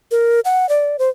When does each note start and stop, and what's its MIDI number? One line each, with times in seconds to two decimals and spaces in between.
0.11 0.40 70
0.45 0.69 78
0.69 0.97 74
0.99 1.10 72